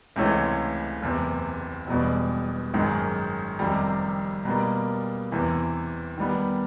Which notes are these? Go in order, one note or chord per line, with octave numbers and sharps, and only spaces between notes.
C#2 C3 E3 A3 C#4
F#1 E2 C3
E1 E2 B2 G3
G#1 F#2 D#3 G#3
F1 F2 C3 D#3 G3
B2 G3 A#3
E2 C3 E3
D#3 G3 B3